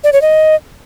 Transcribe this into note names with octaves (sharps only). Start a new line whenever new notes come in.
D5
C#5
D#5